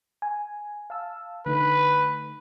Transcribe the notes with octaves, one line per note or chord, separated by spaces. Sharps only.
G#5
F5 A5 E6
D3 A3 D#4 B4